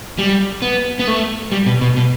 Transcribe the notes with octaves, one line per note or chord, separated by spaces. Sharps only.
G3
B3
B3
A3
G3
B2
B2
B2